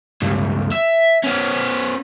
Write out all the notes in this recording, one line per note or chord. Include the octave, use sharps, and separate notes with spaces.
C#2 G2
E5
B3 C#4